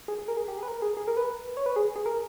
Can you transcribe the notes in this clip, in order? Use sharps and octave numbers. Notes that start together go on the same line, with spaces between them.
G#4
G#4
A#4
G#4
G4
G#4
B4
A#4
G#4
G#4
A#4
B4
C#5
B4
G#4
G#4
A#4